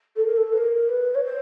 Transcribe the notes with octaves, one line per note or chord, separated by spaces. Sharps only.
A4
A#4
A4
B4
A#4
B4
C#5
C5